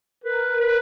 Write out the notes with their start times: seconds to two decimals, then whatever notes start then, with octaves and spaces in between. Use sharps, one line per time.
0.24 A#4 B4
0.60 B4